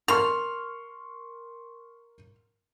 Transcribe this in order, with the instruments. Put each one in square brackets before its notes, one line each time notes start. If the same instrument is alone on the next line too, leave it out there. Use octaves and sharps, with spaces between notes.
[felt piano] A#4 C6 C#6 [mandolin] F6